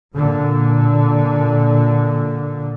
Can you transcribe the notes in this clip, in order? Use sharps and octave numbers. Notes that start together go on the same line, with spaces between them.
A#2 D3